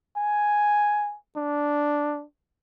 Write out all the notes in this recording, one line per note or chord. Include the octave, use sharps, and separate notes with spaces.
G#5
D4